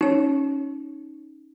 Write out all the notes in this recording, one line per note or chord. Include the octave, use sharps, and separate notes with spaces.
C#4 D#4 C#5